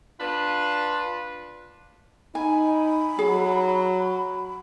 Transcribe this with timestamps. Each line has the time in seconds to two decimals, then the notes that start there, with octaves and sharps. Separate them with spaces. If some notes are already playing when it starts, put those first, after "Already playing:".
0.21 D4 F4 B4
2.35 D#4 G#5 B5
3.19 F#3 G#4